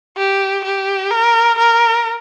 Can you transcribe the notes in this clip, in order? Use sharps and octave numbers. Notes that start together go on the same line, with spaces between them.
G4
G4
A#4
A#4